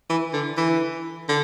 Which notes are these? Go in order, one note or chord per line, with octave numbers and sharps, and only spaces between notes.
E3
D3
E3
D3